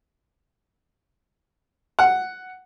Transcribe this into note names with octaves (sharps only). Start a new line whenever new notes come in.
F#5